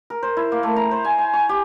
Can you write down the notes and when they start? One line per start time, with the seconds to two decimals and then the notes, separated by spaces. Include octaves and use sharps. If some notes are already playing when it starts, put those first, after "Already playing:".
0.10 A#4
0.23 C5
0.37 E4
0.52 A#3
0.63 A3
0.76 A#5
0.91 C5
1.05 G#5
1.18 G#5
1.34 C#6
1.49 G4